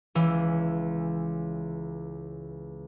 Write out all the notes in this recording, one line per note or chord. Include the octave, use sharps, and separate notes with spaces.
C#2 E3